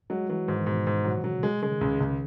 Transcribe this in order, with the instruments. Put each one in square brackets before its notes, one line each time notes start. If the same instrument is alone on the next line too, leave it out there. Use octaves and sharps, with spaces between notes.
[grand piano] F#3 [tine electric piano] G#3
[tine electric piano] E3 [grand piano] F#3
[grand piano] G#2 [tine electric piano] D#3
[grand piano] G#2 [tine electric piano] B2
[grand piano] G#2
[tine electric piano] A#2 [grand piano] F#3
[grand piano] F#3
[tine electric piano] C#3
[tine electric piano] B2 [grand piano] G#3
[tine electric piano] C#3 [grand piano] G#3
[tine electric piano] D#3
[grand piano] C#2 [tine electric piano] C#3
[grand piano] C#2